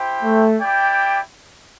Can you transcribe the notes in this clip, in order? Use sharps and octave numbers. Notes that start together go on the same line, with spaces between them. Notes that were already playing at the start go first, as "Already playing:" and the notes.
Already playing: E4 G4 C5 G5
A3
E4 G4 D5 G5